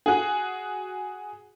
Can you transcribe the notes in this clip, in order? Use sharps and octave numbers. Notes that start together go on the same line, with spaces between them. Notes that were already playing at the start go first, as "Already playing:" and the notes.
F#4 G#4